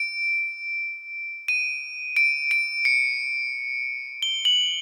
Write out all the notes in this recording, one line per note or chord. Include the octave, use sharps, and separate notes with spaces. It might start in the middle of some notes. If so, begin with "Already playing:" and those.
Already playing: D7
D#7
D7
D7
C#7
G7
F#7